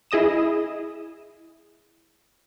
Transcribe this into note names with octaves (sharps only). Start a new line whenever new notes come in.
E4 G#4 D#5 D#6 E7